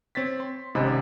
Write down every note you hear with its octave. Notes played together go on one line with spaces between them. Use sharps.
C4 C#5 A6 B6
C6
G#1 G#2 C3 C#4 D#5 B5